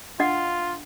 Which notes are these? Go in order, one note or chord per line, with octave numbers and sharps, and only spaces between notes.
D4 F4 D#5 F#5